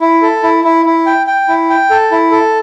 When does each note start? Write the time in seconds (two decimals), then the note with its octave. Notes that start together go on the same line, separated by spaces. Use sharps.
0.01 E4
0.22 A4
0.43 E4
0.64 E4
0.86 E4
1.06 G5
1.27 G5
1.48 E4
1.70 G5
1.90 A4
2.11 E4
2.32 A4